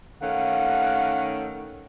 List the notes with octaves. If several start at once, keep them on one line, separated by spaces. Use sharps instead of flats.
D#3 A3 C#4 F5 F#5